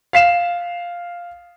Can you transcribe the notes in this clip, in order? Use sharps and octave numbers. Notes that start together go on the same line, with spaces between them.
F5 C7 E7